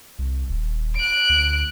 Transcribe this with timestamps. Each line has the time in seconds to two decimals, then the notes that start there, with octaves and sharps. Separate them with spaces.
0.19 C2
0.49 D#1
0.95 F#6 D7
1.29 D2